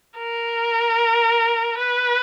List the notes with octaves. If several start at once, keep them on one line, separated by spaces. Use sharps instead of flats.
A#4
B4